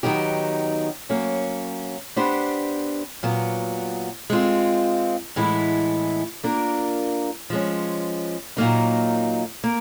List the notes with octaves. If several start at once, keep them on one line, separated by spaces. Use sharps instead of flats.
D#3 F#3 B3 D#4 G4
F#3 A#3 C#4
B3 D4 G4 C5
A#2 F#3 B3
G#3 C4 F4
A2 E3 G#3 B3 E4
A#3 D4 F4 A#4
F3 G#3 C#4
A#2 F#3 A#3 D#4
A#3